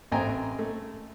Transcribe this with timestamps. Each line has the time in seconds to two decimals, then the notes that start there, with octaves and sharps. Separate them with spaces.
0.12 A1 C4 D#5 G5 G#5 A#5
0.59 A3